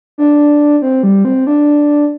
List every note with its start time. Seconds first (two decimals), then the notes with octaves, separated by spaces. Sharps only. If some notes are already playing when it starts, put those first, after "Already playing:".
0.18 D4
0.82 C4
1.03 G3
1.25 C4
1.47 D4